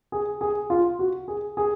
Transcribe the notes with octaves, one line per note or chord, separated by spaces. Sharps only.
G#4
G#4
F4
F#4
G#4
G#4